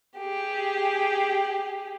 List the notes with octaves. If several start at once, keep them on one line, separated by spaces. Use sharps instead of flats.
G4 G#4